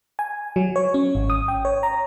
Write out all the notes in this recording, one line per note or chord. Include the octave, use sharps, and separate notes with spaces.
G#5
F#3
C#5
C#4
G#1
D#6
G5
C#5
A#5